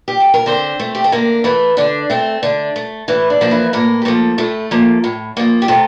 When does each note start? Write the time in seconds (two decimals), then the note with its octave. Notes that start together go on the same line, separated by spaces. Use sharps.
0.08 G4
0.20 A4
0.34 A#4
0.46 D3 C4 C5
0.80 A3
0.95 G4
1.04 A4
1.12 D3 A#3 A#4
1.44 E3 A3 E4
1.77 D3 D4
2.10 A3 C4
2.43 D3 D4
2.76 A3
3.08 A2 E3 E4
3.30 D4
3.41 F3 A#3
3.51 E3 E4
3.73 A2 A#3 A#4
4.02 G4
4.05 F3 A3 A#3 A4
4.38 A2 A3 A4
4.71 F3 A#3
5.04 A2
5.37 F3 A#3
5.62 G4
5.68 C3 A3 A4